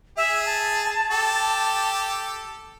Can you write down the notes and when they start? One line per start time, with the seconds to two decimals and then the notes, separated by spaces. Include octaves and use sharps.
0.17 G#4 E5
0.46 A5
1.11 G4 A4